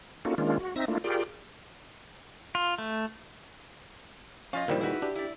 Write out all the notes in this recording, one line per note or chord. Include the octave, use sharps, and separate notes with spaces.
A#3 C#4 D#4 F4 F#4 A4
D#3 G#3 A#3 C#4 D4 F4
F#4
C4 D#4 E5 A#6
A3 A#3 D4 E4 F4
F4 G4 G#4 A#4 D5 G5
F4
A3
F3 C#4 F4 D#5 F5
F2 A#2 D3 D#3 G3 E4 C5
D#4 E4 F#4 G#4 B4
D4 G4
E4 D5